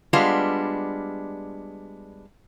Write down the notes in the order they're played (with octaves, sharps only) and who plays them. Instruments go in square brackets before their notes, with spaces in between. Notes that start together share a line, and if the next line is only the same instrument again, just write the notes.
[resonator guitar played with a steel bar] G3 G#3 B3 D4 F4